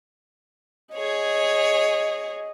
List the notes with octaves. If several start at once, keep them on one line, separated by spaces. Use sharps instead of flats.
G#4 C#5 D#5